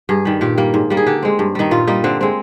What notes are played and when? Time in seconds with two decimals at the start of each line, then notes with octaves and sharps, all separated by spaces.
0.09 G2 G#4
0.25 D#3 G3
0.41 A#2 G4
0.58 G3 A#3
0.74 G#2
0.90 G3 A#3
0.97 G#4
1.06 D3 G4
1.23 G#3 C4
1.39 G2
1.55 D#3 G3 D#4
1.71 A#2 F4
1.87 G3 A#3 D#4
2.04 D3 C4
2.21 G#3 C4